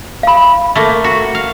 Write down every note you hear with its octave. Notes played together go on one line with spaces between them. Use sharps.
F5 B5
A3 A#3
F#4
F5